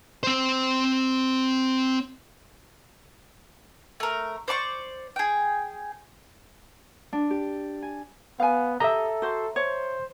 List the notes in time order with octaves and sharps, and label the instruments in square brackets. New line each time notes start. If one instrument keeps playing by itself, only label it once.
[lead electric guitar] C4 C5
[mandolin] A3 A#4
C5 D5 C6 C#6
G#4 G5
[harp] D4
G4
G#5
[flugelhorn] B3 [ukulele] F5 G#5
[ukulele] G4 D#5 [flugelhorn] A4 [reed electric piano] E5 A#5
[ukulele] F#4 C5
[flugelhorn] C5 [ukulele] C#5